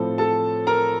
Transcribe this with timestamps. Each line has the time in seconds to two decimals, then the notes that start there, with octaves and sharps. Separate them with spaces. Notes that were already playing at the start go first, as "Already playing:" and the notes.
Already playing: A2 F3 C4 A4
0.18 A4 A5
0.67 A#4 A#5